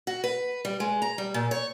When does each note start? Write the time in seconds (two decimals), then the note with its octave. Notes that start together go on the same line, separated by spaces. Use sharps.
0.07 F#4
0.24 B4
0.65 G3
0.80 G#3
1.02 A#5
1.18 G3
1.34 A#2
1.51 C#5